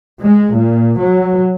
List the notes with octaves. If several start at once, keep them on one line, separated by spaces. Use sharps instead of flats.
G#3
A#2
F#3